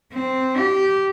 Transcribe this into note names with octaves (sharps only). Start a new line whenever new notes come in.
C4
G4